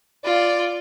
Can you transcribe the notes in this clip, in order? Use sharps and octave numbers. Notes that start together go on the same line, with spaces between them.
F4 D5